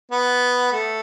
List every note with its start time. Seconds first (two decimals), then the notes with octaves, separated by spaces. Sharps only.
0.12 B3
0.72 A3